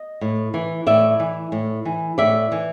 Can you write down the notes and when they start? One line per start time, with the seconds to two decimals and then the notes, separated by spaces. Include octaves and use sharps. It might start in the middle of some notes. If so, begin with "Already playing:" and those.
Already playing: D#5
0.21 A2
0.54 E3
0.86 A2 D5 E5
1.20 E3
1.52 A2
1.85 E3
2.18 A2 D5 E5
2.52 E3